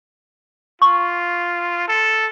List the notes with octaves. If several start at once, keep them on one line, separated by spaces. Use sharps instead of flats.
F4 C#6
A4